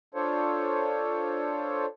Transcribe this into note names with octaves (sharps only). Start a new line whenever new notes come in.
D4 F4 A4 C5 C#5